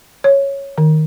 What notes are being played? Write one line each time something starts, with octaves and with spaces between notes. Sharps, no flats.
C#5
D#3